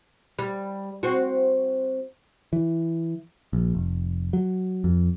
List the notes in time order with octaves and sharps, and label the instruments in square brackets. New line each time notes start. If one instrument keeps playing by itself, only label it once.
[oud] G3
C4 F#4
[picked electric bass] E3
A#1
F1
F#3
F2